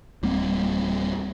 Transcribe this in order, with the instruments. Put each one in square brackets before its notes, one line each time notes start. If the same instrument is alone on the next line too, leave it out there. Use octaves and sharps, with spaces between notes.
[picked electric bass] D1 G3 A#3 C4